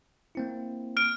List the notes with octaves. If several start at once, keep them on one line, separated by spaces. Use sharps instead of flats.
A#3 C4 E4
F6 D7